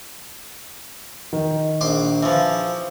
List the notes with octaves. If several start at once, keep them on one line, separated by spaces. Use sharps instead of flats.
D#3
A#1 C6 D6
E3 F3